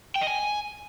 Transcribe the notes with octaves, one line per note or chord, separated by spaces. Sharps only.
G5
D#5
G#5